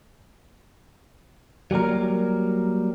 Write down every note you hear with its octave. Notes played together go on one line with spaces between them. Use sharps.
F#3 G3 A#3 A#4